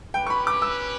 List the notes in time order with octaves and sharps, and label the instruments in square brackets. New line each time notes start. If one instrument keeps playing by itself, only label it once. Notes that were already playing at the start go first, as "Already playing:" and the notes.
[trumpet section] C#4 G4 B4 [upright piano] G5
[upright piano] C#6
B5
D6
E6